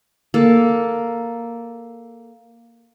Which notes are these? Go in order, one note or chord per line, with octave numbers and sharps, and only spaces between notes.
A#3 A4